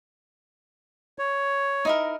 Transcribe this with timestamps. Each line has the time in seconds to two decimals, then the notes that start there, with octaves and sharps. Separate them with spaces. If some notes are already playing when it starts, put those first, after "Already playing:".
1.19 C#5
1.85 D#4 E4 A#4